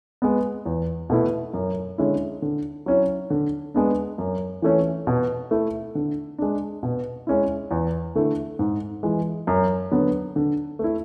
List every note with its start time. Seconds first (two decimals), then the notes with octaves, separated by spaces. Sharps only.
0.22 G#3 B3
0.66 E2
1.10 B2 A3 E4
1.53 F#2
1.98 D3 G#3 C#4 E4
2.42 D3
2.86 F#3 C#4 E4
3.30 D3
3.74 G#3 B3 D4
4.18 F#2
4.62 E3 A3 C#4
5.07 B2
5.51 A3 E4
5.95 D3
6.38 G#3 D4
6.83 B2
7.27 G#3 C#4 E4
7.71 E2
8.15 D3 A3 E4
8.59 G#2
9.03 E3 G#3
9.47 F#2
9.91 D3 F#3 B3
10.36 D3
10.79 A3 E4